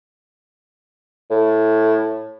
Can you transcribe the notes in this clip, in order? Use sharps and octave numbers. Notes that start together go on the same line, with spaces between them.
A2